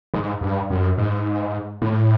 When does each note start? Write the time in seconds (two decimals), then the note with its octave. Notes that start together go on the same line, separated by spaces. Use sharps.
0.14 G#2
0.41 G2
0.70 F#2
0.98 G#2
1.82 A2